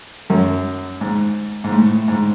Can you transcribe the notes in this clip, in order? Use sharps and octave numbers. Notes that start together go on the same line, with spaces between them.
F#2
G#2
G#2
A2
G#2